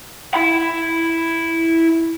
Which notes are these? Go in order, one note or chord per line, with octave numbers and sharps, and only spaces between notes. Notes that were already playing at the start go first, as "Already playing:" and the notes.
E4 B5